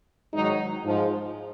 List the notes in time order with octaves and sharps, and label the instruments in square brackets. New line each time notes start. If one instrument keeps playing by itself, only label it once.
[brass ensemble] G#2 D#3 F#3 D#4
G#2 F3